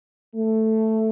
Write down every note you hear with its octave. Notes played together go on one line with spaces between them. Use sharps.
A3